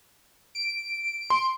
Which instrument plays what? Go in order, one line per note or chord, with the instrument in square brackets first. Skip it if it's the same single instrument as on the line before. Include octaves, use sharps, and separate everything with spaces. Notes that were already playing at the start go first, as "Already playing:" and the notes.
[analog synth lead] D7
[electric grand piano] C6